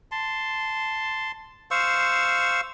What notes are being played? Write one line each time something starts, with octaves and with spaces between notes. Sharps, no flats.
A5 C6
C5 F5 C#6 E6